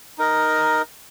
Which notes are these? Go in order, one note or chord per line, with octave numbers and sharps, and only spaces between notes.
D#4 A#4 D#5